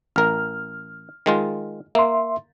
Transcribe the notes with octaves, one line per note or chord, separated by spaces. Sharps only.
A1 A#4 F6
D#3 G#3 F4
A#3 E5 C6